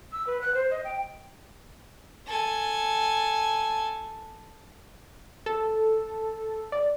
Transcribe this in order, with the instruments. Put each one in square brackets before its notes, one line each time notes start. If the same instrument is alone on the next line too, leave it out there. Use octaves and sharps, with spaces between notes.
[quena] E6
B4
F#6
C5
D#5
G5
[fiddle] A4 G#5
[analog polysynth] A4
D5